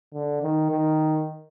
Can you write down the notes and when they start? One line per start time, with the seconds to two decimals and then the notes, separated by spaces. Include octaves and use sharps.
0.14 D3
0.42 D#3
0.71 D#3